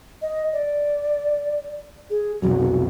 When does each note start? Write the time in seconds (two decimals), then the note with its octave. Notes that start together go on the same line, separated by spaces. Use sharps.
0.22 D#5
0.53 D5
2.10 G#4
2.42 F1 B1 F2 F#4